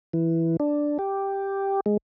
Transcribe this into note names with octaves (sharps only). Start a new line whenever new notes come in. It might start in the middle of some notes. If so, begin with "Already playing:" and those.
E3
D4
G4
G#3